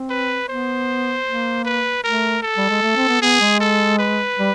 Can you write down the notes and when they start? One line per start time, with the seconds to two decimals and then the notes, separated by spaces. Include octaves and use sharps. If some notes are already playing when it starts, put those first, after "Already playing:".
Already playing: C4
0.10 B4
0.48 B3 C5
1.26 A#3
1.65 B4
2.04 A3 A#4
2.43 A4
2.57 G3
2.70 G#3
2.82 A3
2.96 C4
3.08 B3
3.21 B3 G#4
3.40 G#3
3.60 A4
3.99 B4
4.39 G3